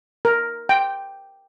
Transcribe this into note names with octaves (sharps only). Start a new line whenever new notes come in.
A#4
G5